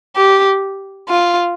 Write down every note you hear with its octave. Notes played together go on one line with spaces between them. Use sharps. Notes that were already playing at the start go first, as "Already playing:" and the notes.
G4
F4